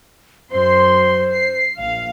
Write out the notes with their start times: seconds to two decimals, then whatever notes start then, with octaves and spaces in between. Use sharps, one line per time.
0.52 F#2 C5 C6
1.34 C7
1.78 A#1 F5